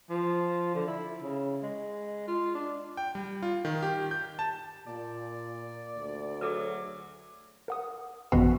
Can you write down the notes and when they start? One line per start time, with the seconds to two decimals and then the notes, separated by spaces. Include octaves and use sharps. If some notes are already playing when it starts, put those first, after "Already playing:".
0.10 F3
0.75 D3
0.88 E4
1.22 C#3
1.62 G#3
2.28 F4
2.55 D4
2.97 G5
3.15 G3
3.43 F4
3.65 D#3
3.83 G4
4.11 G6
4.39 A5
4.87 A#2 D5
5.97 D2
6.41 F#3 G#4 A4 B4
7.68 A#4 F#5 D#6
8.32 A1 F#2 B2